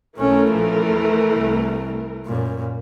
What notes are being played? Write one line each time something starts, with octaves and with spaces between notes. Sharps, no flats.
B1 E3 A3 C#4 A#4
A#1 F3
E2
C2
F#2 A#2